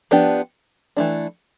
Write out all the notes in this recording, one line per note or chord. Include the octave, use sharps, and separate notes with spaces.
F3 B3 D4 G4
E3 A3 D4